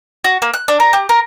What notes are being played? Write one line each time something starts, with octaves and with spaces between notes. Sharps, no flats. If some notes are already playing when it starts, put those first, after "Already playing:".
F#4
A#3
F#6
D4
A#4
G4
A#4